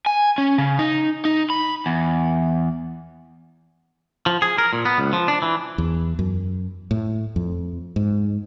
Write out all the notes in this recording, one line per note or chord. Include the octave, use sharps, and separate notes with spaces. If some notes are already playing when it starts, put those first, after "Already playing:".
G#5
C#4
C#3
D#4
D#4
B5
E2
F3
G#4
A#4
A#2
B3
C#2
F3
D4
E3
E2
F#2
A2
F2
G#2